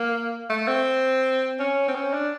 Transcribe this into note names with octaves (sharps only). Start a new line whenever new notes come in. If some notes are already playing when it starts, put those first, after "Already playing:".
Already playing: A#3
A3
C4
C#4
C4
C#4
D4